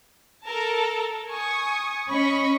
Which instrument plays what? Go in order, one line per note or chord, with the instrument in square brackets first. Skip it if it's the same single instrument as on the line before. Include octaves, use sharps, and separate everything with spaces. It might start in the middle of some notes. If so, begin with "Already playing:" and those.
[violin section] A4 A#4 A5
G#5 C#6 D#6
[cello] C#4 [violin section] D#5 B5 C#6